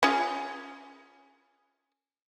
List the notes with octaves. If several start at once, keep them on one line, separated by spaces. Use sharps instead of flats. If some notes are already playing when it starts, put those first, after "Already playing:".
C#4 F4 G#4